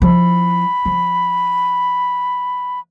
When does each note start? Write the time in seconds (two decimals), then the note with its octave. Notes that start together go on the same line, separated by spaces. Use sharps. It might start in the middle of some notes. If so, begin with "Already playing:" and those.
0.02 F3 E4 B5
0.85 F3